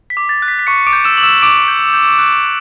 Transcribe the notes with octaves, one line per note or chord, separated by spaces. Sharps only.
B6
D6
A6
F#6
B6
B6
C#6 D6 C#7
D6 D7
G6
E6 E7
D6 F#7
E6 E7
D6 D7
G6
G6
F#6
F#6